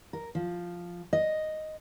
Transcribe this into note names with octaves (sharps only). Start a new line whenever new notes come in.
A#4
F3
D#5